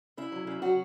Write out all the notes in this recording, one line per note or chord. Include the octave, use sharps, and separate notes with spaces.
C#3 E4
F#3
C#3
F#3 F#4